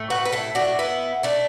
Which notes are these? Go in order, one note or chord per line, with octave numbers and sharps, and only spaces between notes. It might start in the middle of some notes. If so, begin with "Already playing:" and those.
Already playing: A2 A3
F#4 B4
B4
E4 A4
D4 F#4
B3 E4
A3 D4